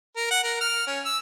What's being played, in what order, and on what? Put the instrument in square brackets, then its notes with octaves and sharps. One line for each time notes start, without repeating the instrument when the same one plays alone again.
[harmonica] A#4
F#5
A#4
F6
C#4
E6